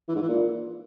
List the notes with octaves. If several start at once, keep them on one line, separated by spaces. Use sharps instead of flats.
E3
G#2
E3
A#2